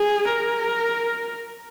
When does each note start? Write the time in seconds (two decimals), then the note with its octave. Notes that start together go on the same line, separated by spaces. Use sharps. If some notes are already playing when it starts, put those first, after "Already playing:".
Already playing: G#4
0.29 A#4